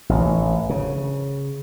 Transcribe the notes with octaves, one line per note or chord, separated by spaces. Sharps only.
A1
C#3